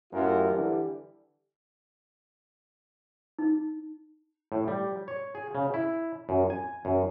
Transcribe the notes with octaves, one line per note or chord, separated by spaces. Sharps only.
F#2 A2 F4 G4 A#4
D3 E3 G3
D#4
A2
G3
C#5
G#4
C#3
E4
F#2
G#5
F#2